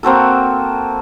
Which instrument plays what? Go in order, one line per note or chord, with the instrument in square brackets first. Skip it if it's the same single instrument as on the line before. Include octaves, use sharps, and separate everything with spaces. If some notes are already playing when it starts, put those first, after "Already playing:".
[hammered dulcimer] A#3 C4 F#4 A4